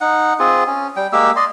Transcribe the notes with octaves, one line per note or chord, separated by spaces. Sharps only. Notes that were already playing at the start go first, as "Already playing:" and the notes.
D#4 F#5
C4 F4 G#4
C#4
G3 G5
G#3 A#3 G4 E6
D5 D#5 C6